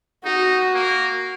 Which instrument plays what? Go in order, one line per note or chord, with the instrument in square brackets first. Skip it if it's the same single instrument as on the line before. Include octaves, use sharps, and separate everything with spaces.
[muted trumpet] D#4 [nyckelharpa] F#4
[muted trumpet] A#3